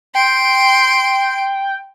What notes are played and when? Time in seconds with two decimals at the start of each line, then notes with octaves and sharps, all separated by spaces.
0.15 G5 C6 D7